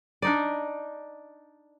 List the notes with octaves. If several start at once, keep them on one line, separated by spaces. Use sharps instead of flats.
D4 D#4 D5